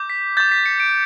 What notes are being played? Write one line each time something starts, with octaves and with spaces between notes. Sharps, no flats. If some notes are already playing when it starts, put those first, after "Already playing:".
Already playing: D6 G6
B6
D6 G6 A6
B6
C#7
D7